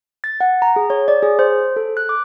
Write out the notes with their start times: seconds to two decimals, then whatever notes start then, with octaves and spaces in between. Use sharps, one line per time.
0.24 A6
0.41 F#5
0.62 A#5
0.76 G#4
0.90 C#5
1.08 D5
1.23 G#4
1.39 C5
1.76 A4
1.97 F#6
2.09 D6